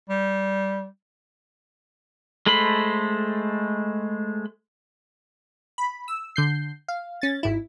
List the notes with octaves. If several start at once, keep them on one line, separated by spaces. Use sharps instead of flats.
G3
G#3 A3 A4 C5 B5
B5
E6
D3 G6 C7
F5
C#4 A6
G#1 E4